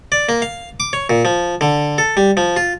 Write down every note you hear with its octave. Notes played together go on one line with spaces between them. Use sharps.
D5
A#3
F5
D6
C#5
A#2
F3
D3
A4
G3
F3
F4